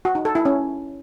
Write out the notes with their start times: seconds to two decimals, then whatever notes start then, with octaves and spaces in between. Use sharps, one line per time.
0.05 F#4
0.15 D#4
0.25 A4
0.35 E4
0.45 C#4